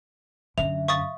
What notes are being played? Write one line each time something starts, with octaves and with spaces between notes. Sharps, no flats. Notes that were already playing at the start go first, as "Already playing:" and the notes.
F#2 D3 E5 F7
F5 C#6 D#6 A6